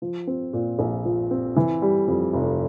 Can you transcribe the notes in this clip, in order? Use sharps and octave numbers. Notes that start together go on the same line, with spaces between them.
F3
C4
A#2
A#1
F3
C4
E3
G3
F2
F1